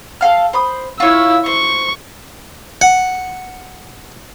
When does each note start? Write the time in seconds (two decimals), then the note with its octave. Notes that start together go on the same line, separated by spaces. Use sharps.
0.21 A4 F5 F6
0.53 C5 B5 D#6
1.00 E4 F4 C#5 E6
1.46 C5 C#6
2.81 F#5